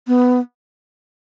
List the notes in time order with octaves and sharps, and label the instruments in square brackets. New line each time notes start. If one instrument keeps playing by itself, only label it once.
[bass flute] B3